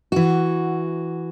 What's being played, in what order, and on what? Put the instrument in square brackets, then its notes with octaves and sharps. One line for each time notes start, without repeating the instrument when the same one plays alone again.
[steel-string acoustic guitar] E3 F#4